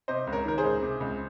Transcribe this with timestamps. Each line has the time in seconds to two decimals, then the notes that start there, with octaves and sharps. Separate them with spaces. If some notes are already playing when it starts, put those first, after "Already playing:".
0.08 C3 C5 D#5
0.27 C#2
0.32 A#4 C#5
0.45 D#3 A#4
0.58 G#4 C5
0.64 C#2
0.82 C3
1.00 C#2